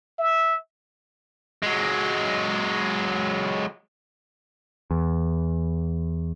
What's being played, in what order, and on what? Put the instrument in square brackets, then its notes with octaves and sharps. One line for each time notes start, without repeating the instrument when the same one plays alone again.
[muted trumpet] E5
[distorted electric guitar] F#3 G#3
[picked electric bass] E2